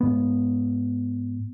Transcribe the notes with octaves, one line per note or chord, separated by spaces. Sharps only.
G#2 B3